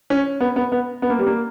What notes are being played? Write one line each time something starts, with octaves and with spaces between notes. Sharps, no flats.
C#4
B3
B3
B3
B3
A#3
G3
A#3